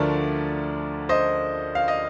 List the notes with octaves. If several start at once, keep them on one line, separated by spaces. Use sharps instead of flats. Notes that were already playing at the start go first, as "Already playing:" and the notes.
Already playing: D2 D3 F3 A3 A#4 D5
C5 D#5
F5
D#5